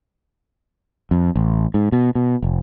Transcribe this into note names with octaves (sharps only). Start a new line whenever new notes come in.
F2
A1
G#2
B2
B2
F1